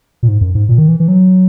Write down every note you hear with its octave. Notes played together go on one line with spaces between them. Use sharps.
A#2
G#2
F#2
G#2
A#2
D#3
E3
E3
F#3